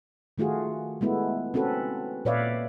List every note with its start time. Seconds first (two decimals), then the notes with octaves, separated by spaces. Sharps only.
0.38 D#3 A3 F4 F#4 G#4
1.01 G#3 A3 B3 E4
1.54 C4 C#4 F#4 A4 B4
2.25 A#2 B4 C#5 D5 E5 F5